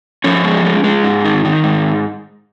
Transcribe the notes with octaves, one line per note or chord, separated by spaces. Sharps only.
F3 C#4 C#5
G#3
G#3
G#3
G#2
D#3
D#3
G#2